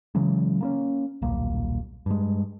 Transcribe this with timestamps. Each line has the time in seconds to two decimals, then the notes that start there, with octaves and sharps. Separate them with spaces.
0.15 C#3 E3 F#3 G#3
0.61 A#3 B3 C#4
1.22 D#1 B1 A#3
2.06 G2 G#3